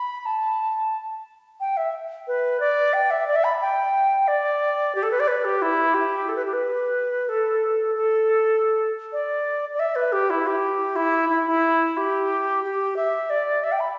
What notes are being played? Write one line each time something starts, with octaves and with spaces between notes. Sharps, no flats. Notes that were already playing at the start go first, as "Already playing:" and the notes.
Already playing: B5
A5
G5
E5
B4
D5
G5
E5
D5
E5
B5
G5
D5
G4
A4
B4
D5
B4
G4
E4
G4
A4
B4
G4
B4
A4
A4
D5
D5
E5
B4
G4
E4
G4
E4
E4
E4
G4
G4
E5
D5
E5
G5
B5